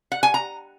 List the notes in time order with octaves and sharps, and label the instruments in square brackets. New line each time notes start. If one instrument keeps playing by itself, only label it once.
[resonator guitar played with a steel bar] F#5
G#5
A#5